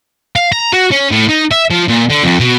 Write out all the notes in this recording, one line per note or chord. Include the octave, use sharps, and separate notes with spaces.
F5
A#5
F#4
C#4
A2
D#4
E5
F3
A#2
D3
F2
B2